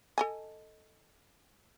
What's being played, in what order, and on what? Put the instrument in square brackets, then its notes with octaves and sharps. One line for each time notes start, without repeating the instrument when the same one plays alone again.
[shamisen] A4 D#5 G#5